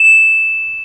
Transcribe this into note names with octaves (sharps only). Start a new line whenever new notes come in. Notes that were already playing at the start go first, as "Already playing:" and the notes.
Already playing: E7